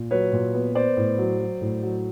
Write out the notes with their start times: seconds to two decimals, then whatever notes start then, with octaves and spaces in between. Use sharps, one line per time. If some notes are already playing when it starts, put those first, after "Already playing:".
Already playing: A#2
0.11 F#3 B4 C#5
0.33 A#2
0.54 B3
0.75 B3 C5 D5
0.97 A2
1.18 F#3
1.39 F#3
1.61 A2
1.83 F#3